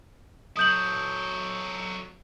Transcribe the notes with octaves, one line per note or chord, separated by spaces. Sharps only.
F#3 A4 D#6 G6 F#7